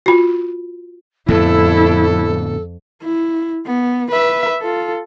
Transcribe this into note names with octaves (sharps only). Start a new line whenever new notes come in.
F4 F#4
F2 A2 D3 B3 E4 A4
E4
B3
B4 E5
F4 A4